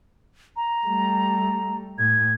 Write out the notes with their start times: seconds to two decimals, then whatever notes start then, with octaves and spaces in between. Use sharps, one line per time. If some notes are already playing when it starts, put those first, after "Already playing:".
0.56 A#5
0.86 G3 A3
1.98 A2 G#6